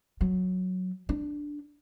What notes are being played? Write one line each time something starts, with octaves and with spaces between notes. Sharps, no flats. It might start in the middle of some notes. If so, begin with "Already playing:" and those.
F#3
D4